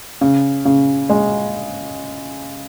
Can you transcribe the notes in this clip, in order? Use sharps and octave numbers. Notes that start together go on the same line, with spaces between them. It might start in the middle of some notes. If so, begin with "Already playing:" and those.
C#3
C#3
G#3